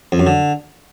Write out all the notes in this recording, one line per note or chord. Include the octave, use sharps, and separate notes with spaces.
F2
F#2
D3